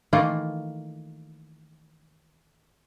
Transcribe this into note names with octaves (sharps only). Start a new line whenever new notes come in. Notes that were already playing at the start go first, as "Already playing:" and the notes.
D#3 E3 A3 A#3 F4